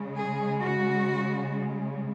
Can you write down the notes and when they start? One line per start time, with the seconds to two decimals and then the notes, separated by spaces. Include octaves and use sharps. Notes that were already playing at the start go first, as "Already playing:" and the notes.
Already playing: C#3 G#3
0.16 G#4
0.59 F#4